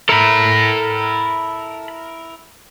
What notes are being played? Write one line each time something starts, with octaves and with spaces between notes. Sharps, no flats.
E4 A4 A#4 B5